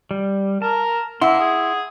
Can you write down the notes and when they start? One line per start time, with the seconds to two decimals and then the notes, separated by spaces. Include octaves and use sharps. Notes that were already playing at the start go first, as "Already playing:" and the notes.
0.11 G3
0.62 A#4 A5
1.22 A#3 E4 F#5 C6 E6
1.40 G#4